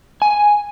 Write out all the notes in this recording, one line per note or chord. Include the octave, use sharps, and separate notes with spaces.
G#5